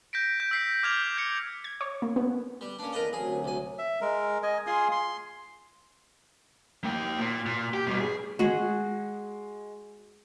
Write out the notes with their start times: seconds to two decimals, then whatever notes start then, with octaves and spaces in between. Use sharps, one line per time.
0.13 G6 A#6 B6 D7
0.40 G6
0.51 E6 B6 C7
0.83 D6 F6 G6 G#6 F7
1.18 G6 C#7
1.64 G#6
1.81 C#5
2.02 A#3
2.16 B3
2.61 G3 B4
2.79 A#3 C#4 D4
2.93 E2 A#4 B4 D#5 A5
3.13 D2 C3 F#3 G#4
3.44 C2 G#5
3.78 E5
4.01 G#3 A#4
4.43 D#5 G#5
4.67 F4 G#4 G#5 C6
4.91 C6
6.84 A#3 G5
7.20 A#2
7.46 A#2
7.74 G4
7.87 G2 B2
8.01 G#4
8.39 G#3 F#4 G#4